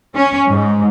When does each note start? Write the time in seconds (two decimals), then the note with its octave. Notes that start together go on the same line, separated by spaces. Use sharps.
0.15 C#4
0.49 G#2